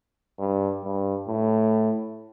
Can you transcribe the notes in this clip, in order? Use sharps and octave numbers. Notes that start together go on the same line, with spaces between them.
G2
G2
A2